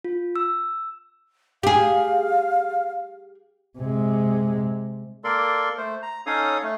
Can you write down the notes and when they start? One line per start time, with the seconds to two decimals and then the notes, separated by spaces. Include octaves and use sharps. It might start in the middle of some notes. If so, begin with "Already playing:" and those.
0.04 F4
0.36 E6
1.63 G4 G#4 F5
3.79 C3 G#3
5.24 A#3 A4 A#4 D5 C6
5.78 A3 C5
6.03 A#5
6.26 C#4 D#4 A4 C#5 F5 D#6
6.63 A3